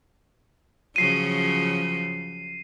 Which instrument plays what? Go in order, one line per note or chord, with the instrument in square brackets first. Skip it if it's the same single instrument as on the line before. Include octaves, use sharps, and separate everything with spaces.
[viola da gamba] C#3 F3 F#3 [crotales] C7 D#7